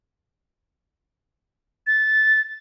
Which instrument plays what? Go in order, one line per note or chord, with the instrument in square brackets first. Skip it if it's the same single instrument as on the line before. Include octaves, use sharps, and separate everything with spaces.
[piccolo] A6